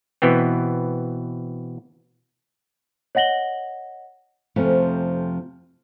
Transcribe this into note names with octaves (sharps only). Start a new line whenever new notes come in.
B2 E3 B3 C4
C#5 D#5 F#5 A#6 F#7 G7
F2 C3 F3 A3 C#4